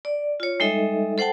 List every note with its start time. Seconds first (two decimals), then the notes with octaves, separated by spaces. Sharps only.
0.05 D5
0.40 F4 C#5
0.60 G3 G#3 D#4 A4 D#5 E5
1.18 A4 C5 F#5 G5 A5